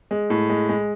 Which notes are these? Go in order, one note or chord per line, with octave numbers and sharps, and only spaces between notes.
G#3
A2
G#3
G#3